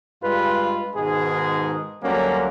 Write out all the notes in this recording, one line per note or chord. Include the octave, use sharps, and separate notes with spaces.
G2 G3 G#3 F4 B4
G#2 B2 D#3 G#3 G#4
D2 D3 F#3 G3 A#3 C#4